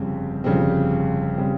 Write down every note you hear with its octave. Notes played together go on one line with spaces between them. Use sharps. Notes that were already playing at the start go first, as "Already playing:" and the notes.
Already playing: G1 F2 C#3 G3 C4
G1 F2 C#3 G3 C4
C#3 G3 C4